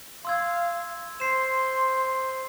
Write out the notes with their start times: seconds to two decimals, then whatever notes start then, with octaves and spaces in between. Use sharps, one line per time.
0.25 F5 C6 E6 G#6
1.20 C5 C6 C7 E7